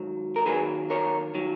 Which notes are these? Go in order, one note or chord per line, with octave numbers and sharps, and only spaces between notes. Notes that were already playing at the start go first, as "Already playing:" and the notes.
Already playing: G#2 D#3 F#3
A#4
D#2 D#3 F#3 G#4 B4
A#4 C#5
D#3 F#3